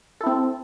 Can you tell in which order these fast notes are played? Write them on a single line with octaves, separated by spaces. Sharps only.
A4 E4 C4